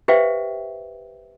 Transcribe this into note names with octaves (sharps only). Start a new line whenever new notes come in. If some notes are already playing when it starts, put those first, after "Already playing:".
G4 B4 C5 E5 F5 G5